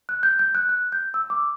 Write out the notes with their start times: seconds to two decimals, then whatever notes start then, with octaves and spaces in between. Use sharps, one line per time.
0.09 F#6
0.23 G6
0.39 G6
0.55 F#6
0.69 F#6
0.92 G6
1.14 E6
1.30 D6